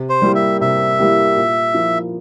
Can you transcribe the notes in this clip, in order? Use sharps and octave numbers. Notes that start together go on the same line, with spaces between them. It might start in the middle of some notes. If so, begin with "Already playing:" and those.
Already playing: C3
C5
G3 A#3 E4 G4
E5
C3 E5
G3 A#3 E4 G4
A#2
F3 A#3 E4